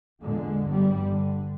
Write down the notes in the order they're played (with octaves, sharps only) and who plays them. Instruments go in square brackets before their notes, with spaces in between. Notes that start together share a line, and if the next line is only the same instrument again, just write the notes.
[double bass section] E2 A#2 D3 G#3
G1 G2 G3
D3